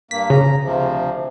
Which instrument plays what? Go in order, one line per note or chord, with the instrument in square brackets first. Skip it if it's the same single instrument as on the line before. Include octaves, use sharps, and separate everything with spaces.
[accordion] G2 A#3 [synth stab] B6
[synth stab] C#3 [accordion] A#5
[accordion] D2 C3 F3